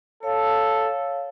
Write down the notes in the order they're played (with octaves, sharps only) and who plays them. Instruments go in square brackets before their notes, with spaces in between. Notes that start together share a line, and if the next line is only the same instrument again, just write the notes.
[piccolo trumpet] A4 [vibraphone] C#5 F5